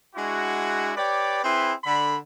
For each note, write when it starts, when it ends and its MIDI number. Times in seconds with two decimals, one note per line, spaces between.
0.15 0.91 56
0.15 0.91 62
0.15 0.91 64
0.15 0.91 66
0.97 1.43 67
0.97 1.43 71
0.97 1.43 73
0.97 1.43 74
1.44 1.73 60
1.44 1.73 64
1.44 1.73 68
1.44 1.73 71
1.44 1.73 84
1.84 2.16 50
1.84 2.16 83